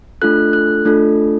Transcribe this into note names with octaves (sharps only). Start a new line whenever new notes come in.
A3 D4 F4 A4 F#6
F#6
A3 D4 F4 A4